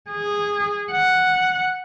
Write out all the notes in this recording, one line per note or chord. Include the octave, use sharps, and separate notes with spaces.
G#4
F#5